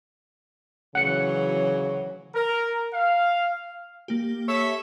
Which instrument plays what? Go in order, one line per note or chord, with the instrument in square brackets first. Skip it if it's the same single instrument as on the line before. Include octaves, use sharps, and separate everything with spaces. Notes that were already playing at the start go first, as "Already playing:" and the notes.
[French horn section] D2 C#5 [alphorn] C#3 [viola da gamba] E3 F#3 [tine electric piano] F#5 C#7
[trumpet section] A#4
F5
[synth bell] A#3 G4
[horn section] A4 C#5 E5